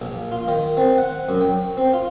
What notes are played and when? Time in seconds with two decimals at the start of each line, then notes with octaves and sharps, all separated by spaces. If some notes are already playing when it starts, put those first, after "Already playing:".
0.01 A#1
0.32 F4
0.48 D#3
0.77 C4
0.98 F#5
1.29 F#2
1.41 G5
1.77 C4
1.93 F4